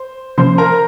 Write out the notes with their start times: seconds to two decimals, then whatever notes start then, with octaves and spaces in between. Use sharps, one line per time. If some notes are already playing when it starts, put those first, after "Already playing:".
Already playing: C5
0.38 C3 F3 A#3 C#4 C5 C6
0.58 A#4 A#5